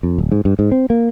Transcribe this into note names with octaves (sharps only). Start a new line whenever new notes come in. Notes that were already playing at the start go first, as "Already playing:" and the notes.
F2
D1
G#2
G2
G#2
C4
A#3